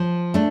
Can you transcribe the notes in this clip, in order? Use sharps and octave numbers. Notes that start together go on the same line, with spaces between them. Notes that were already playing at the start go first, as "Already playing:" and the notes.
Already playing: F3
A3 D4